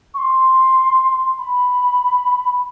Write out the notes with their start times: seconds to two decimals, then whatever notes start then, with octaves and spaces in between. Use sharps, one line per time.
0.14 C#6
0.18 C6
1.39 B5